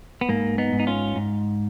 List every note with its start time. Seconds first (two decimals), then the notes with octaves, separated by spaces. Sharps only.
0.21 B3
0.29 G#2 A#3
0.58 B3 D#4
0.73 G#2
0.79 D#4
0.87 C#4 F4
1.16 G#2